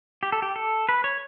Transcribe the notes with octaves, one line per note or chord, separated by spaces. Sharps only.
G4
A4
G4
A4
B4
C#5